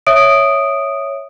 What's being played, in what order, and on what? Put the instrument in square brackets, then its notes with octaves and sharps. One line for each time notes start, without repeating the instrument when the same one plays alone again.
[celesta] C#5 E5 D#6 D7